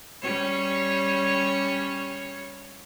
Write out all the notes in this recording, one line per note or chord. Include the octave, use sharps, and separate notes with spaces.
G3 C#4 C#5